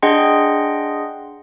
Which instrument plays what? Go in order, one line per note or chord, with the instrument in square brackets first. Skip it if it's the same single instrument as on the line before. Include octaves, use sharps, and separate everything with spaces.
[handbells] D4 G#4 D#5 F#5 G5 C6